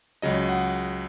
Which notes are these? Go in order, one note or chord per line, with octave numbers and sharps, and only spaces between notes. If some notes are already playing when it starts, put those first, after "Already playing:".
C#2 C#3 F#3 D#5
F#5